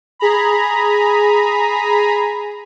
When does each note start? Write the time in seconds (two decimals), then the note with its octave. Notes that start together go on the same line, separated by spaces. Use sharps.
0.19 G#4 A#5 B5